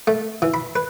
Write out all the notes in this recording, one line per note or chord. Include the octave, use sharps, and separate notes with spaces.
A3
E3
B5
B4